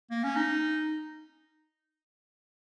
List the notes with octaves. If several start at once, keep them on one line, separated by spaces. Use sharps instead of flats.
A#3
C#4
D#4